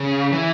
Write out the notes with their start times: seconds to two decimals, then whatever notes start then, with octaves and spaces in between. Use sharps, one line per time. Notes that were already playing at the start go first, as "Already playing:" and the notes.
Already playing: C#3
0.32 E3